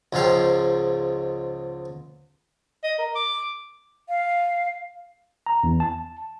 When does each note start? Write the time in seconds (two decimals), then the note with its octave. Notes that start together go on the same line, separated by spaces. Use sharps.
0.13 C#2 G#2 F3 F5 G5
2.83 D#5
2.98 A#4
3.15 D6
4.09 F5
5.46 A#5
5.64 E2
5.80 A5